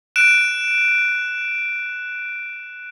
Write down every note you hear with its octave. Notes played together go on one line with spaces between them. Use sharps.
F#6 D7 E7